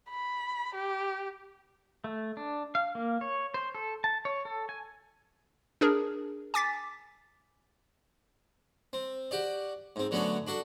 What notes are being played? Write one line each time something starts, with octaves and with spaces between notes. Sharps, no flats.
B5
G4
A3
D4
F5
A#3
C#5
C5
A4
A5
C#5
A4
G#5
D4 G#4 A#4
G#5 D6 A6 B6
C4
F#4 G4 D5
G#2 C4
D3 F#3 A3 B3 C#4 D4
D4 F#4 A4 A5